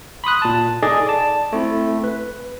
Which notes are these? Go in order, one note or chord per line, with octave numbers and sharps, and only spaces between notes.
B5 C6 D#6 F#6
A#2 A5
D#4 G#4 A4 D5 D#5 G#5
D5 A5
A3 C4 E4
B4